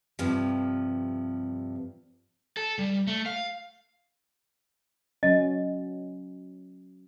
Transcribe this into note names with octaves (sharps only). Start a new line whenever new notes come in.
G2 C3 F3
A4
G3
A3
F5
F#3 C#4 D#5